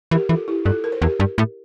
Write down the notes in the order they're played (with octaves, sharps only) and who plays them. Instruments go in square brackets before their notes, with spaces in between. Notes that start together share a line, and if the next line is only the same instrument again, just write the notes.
[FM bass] E3 [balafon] G4 A#4
[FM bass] E3 [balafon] F4 A4
[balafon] E4 G4
[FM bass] G2 [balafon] F4 A4
[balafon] A#4
C5
[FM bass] E2 [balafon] G4 A#4
[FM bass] G2
A2